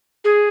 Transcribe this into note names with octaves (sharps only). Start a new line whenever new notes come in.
G#4